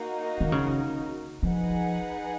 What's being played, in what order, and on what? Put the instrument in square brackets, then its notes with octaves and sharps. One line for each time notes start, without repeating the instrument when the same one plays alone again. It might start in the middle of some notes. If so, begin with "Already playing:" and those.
Already playing: [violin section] A#3 D#4 F#4
[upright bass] D#3
C#3
[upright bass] F3 [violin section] D#4 G#4 B4 F#5